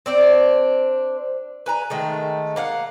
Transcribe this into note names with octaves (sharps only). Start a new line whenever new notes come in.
C4 D4 C5
B4 G#5 A#5
D#3 G#3 A3
A#3 F5 F#5